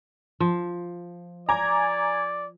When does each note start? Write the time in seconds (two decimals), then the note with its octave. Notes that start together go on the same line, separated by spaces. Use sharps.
0.40 F3
1.49 D5 G#5 A#5 D6 G#6